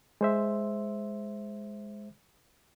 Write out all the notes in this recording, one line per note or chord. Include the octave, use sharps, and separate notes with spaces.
G#3 C5 E5